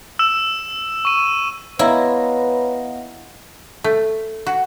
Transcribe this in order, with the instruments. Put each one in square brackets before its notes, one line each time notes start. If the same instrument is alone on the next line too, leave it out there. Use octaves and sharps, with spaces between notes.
[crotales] E6 E7
C#6 D#7
[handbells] B3 D#5 F5 [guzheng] E4 [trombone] B4 [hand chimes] C#5 A#5
[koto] A3
F#4